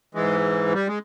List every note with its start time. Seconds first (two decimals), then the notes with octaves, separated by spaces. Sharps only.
0.15 G#2 E3 G#3
0.74 G3
0.88 G#3